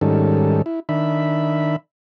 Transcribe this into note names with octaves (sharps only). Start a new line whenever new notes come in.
G#2 D#3 G3 C#4 A4
E4
D#3 D4 E5 B5